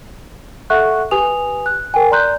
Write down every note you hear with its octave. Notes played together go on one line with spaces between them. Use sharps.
A4 E5 F#5 C#6 F#6
G4 B4 G#5 D#6 F7
F#6
A#4 G5 G#5
D5 A#5 C6 F#6 G6